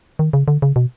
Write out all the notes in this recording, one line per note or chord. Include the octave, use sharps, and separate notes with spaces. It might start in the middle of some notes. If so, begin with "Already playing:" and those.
D#3
C#3
D3
C#3
B2